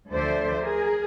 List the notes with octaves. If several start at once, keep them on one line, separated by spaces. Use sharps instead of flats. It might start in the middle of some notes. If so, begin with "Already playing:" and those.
D2 F3 A4 C5 D5 E5
G#4 A#4